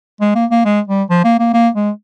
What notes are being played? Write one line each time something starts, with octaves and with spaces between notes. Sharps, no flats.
G#3
A#3
A#3
G#3
G3
F3
A#3
A#3
A#3
G#3